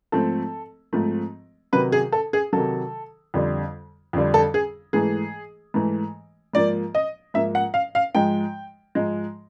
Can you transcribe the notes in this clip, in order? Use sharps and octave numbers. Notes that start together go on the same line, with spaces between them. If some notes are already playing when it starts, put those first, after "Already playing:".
G#2 F3 A3 C4 A4
G#2 F3 A3 C4
C3 D#3 F#3 B4
G#4
A4
G#4
C3 D#3 F#3 A4
F2 D3 G3
F2 D3 G3
A4
G#4
G#2 E3 A3 G#4
G#2 E3 A3
G#2 F3 A#3 D5
D#5
G#2 F3 A#3 E5
F#5
F5
F5
G#2 F3 G#3 G5
G#2 F3 G#3